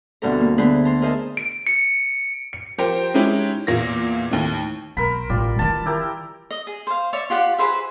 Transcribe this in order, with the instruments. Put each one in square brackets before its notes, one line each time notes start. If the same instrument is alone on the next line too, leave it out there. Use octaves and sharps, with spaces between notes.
[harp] D2 G2 B2 C4 A4 A#5
A#3
D3 A3 B3 G#4 B4 C5
A5 A#5 C6
G#4 A#4 C5 D#5 E5 A5
[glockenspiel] D7
C#7
[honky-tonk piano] C#7
F3 G4 A#4 C5 G5
G#3 C#4 D#4 E4 G4
E2 A#2 A#3 A#6
D#2 A2
[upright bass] B1 [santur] A#4 C5 B5
[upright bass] A1 [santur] G3 F4
[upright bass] D#3 E3 [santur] A5
[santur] E4 G4 A#4
[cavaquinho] D#5
G#4
C5 F5
C#5 D5 E5
F4 G4 F#5 D6
G#4 B4 C5 E5